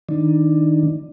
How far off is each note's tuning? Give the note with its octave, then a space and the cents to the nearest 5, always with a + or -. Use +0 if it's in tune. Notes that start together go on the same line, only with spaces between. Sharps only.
D#3 +15 D4 +10